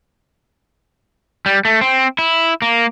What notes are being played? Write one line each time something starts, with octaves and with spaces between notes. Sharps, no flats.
G3
A3
C4
E4
A#3